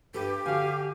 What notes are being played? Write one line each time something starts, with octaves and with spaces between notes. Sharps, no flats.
G2 G4 A4 B4
D3 F#4 F5 G#5